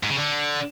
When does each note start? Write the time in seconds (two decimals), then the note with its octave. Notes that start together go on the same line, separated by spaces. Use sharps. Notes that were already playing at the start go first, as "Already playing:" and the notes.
0.03 G#2
0.10 C#3
0.17 D3